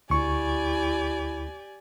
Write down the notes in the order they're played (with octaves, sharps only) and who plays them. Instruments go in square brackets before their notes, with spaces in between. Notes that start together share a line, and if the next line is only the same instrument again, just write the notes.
[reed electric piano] D2 C#6 [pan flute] E4 [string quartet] G4 D5 G#5